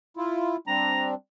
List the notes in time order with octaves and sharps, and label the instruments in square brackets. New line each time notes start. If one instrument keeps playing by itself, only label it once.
[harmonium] E4 F4
[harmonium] G3 C4 D4 [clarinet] A#5